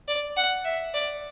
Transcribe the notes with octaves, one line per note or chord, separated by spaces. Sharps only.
D5
F#5
E5
D5